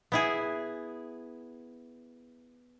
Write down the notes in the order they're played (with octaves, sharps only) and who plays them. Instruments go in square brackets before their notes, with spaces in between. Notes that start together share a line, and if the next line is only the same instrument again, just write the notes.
[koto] B3 E4 G#4